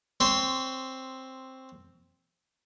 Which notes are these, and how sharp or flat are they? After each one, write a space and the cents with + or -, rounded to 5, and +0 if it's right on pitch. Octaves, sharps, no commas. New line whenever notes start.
C4 +5 C#5 +20 C6 +0